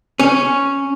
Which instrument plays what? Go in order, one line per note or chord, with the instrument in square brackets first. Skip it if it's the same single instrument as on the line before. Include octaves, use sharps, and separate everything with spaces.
[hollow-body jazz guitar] C#4